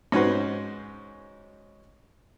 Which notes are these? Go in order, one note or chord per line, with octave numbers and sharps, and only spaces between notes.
G#2 C#4 D#4 F#4 B4 C5